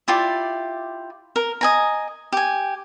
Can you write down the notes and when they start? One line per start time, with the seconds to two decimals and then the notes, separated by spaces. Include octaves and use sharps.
0.08 E4 F4 G4 D5
1.36 A#4
1.61 D#5 G#5 A#5
2.33 G4 G#5